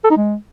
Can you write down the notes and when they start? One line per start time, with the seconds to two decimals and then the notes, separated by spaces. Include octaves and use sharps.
0.04 A4
0.10 D#4
0.17 G#3